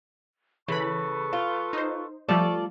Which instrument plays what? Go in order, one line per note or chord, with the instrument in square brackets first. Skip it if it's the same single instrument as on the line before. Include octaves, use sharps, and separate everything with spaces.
[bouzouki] C#3 [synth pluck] E3 B5 [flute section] A4 B4 C#6
[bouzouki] F4
[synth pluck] D#4 C5
[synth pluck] F3 G3 A3 [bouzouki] F4 A4 D5 [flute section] C#6